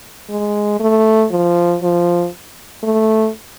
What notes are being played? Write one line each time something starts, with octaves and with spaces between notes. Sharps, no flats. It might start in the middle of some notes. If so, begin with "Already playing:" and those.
G#3
A3
F3
F3
A3